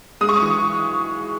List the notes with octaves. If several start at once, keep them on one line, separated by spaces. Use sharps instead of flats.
G#3 D#6
C#6
D#6
E3